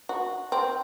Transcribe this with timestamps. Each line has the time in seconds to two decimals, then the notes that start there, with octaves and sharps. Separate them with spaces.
0.09 F#4
0.52 C4